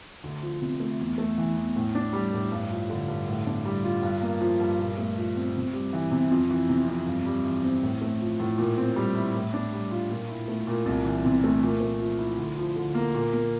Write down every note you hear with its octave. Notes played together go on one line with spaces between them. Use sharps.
D2
F3
C3
A3
E2
A3
E3
E2
A2
D4
G3
A2
G2
F3
D3
G2
A2
D4
G3
F4
G2
A#3
F3
G2
A#2
A3
F3
C4
C3
G3
E3
C3
F2
E3
C3
F2
G2
G3
E3
C4
A2
A3
F3
A2
A#2
C4
G3
E4
A2
D4
G3
F4
A#2
E4
A3
A#2
C2
E3
C3
A3
A#2
A3
F3
E4
D2
F3
D3
A#3
A#2
A#3